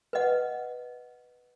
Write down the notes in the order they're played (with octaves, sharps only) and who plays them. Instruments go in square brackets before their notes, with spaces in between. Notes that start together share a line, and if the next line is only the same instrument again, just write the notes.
[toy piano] B4 D#5 F#5